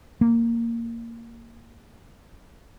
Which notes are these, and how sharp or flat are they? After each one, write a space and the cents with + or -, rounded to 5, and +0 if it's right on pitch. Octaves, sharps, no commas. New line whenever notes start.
A#3 -10